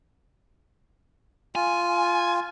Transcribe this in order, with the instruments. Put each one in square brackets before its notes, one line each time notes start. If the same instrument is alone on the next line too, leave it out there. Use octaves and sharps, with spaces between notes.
[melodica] F4 [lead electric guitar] G#5